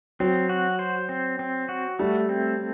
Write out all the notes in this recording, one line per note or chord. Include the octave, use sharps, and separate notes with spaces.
F#3 C4
F#4
C5
C4
C4
F#4
G3 A3
C4